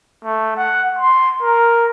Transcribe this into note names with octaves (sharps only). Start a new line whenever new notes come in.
A3
F#5
C6
A#4